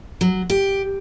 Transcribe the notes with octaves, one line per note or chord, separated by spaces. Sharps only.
F#3
G4